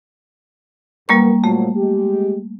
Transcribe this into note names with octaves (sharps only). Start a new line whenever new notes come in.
F#2 G3 A#3 B3 A#4 C#6
A#2 F3 F#3 A3
G#3 G4